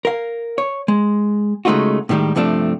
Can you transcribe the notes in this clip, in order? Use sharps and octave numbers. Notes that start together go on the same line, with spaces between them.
A#4 F5
C#5
G#3
C#3 G#3 A3 D#4 F4 F#4
A2 D3 D#3 G3 G#3
G2 C3 F3 A3 D4